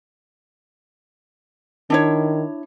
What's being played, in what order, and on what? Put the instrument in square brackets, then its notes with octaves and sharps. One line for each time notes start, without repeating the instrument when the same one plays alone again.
[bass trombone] D#3 [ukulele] D4 E4 C#5